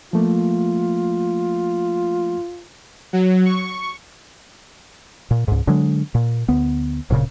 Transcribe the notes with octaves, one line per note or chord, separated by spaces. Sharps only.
F3 A3 A#3 F4
F#3
C#6
A#2
C#2 G#2
D3 F#3 G#3 D4
A#2
D2 B3
D1 A#2 C#3